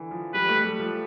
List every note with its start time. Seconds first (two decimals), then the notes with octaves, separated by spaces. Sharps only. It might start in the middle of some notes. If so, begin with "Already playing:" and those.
Already playing: D3 E3
0.11 F3
0.34 G3 B4
0.49 A3
0.65 G3
0.80 F3